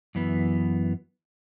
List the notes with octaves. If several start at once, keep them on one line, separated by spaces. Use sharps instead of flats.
F#2 E3 B3